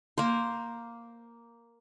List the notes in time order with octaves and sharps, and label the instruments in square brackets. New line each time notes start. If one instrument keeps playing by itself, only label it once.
[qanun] A#3 C5